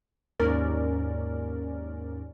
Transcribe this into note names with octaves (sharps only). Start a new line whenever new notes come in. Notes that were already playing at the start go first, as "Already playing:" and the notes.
D#2 G#2 C#4 A#4 D5